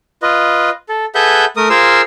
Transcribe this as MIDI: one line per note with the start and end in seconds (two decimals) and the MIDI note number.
0.22 0.70 65
0.22 0.70 71
0.22 0.70 75
0.89 1.05 69
1.15 1.45 68
1.15 1.45 69
1.15 1.45 71
1.15 1.45 76
1.15 1.45 78
1.15 1.45 91
1.56 1.68 57
1.56 1.68 70
1.56 1.68 87
1.70 2.01 65
1.70 2.01 68
1.70 2.01 70
1.70 2.01 72
1.70 2.01 77
1.70 2.01 88